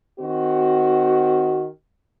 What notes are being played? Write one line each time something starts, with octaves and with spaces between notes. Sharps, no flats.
D#3 C4 F#4